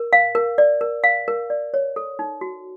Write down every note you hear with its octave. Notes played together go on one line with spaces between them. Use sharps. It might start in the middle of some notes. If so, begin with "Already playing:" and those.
Already playing: A#4
F5
A#4
D5
A#4
F5
A#4
D5
C#5
A4
D#4
F#4